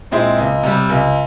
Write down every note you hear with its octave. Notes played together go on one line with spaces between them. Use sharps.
A#2 G#3 C4 E4
C#2
C3 G3
C#2